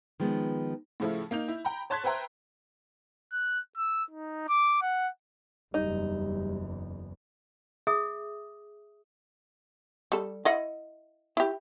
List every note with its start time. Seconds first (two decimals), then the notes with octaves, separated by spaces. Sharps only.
0.20 D#3 F3 G#3 B3
1.00 A2 C#3 F3 A3 E4
1.31 A#3 D#4 G6 F7
1.48 E4
1.65 G5 A#5 B5
1.90 C#5 A5 C6 F#6 G#6 B6
2.04 B4 C5 E5 G5 A#5 C6
3.32 F#6
3.77 E6
4.11 D#4
4.49 D6
4.82 F#5
5.74 F#1 E2 G3 D#4
7.87 G#4 E5 D#6
10.12 G3 A4
10.45 E4 D#5 F#5
11.37 E4 G4